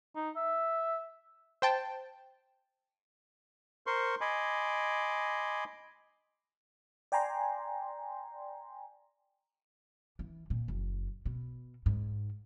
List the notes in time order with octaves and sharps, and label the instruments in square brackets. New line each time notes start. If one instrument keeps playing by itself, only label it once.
[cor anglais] D#4
E5
[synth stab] C5 G5 A5
[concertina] A#4 C5 C6 C#6
D#5 G#5 B5 C6 D6
[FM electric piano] D5 G5 G#5 A#5 C6
[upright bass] E3
A#2
F#1
B2
G#2